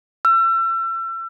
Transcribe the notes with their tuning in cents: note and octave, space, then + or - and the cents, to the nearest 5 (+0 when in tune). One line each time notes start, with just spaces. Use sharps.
E6 +35